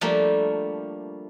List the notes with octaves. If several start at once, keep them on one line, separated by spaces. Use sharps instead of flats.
F3 G3 A3 A#3 D4